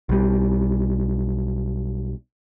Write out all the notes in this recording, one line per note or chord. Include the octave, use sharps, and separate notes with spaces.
B1 G3